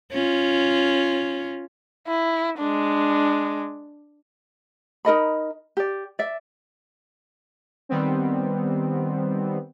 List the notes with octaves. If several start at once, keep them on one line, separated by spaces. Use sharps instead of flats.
C#4 F4
E4
G#3 D4
D#4 A#4 D#5 B5
G4 D5
D5 E5
D#3 G3 B3 C4